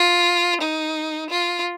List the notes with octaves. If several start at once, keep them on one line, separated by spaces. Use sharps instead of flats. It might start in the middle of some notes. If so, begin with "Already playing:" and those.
Already playing: F4
D#4
F4